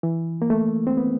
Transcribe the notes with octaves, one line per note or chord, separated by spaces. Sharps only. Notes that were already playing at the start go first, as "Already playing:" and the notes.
E3
A#3
A3
C4
B3